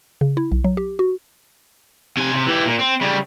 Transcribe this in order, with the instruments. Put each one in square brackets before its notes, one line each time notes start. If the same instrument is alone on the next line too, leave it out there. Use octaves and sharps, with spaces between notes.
[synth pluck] C#3
E4
B1
F#3
G4
F#4
[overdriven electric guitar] C3 G#5
C3
E3 G4
A#2
C4
C#3 G3